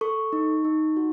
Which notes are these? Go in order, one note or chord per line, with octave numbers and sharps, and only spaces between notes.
A4 C#6
D#4
D#4
F#4